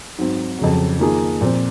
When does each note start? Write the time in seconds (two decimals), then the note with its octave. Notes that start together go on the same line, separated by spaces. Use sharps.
0.18 G#2 F#3 C4
0.59 F2 C#3 F#3
0.99 D#3 A#3 F4 G#4
1.41 A#2 F3 C4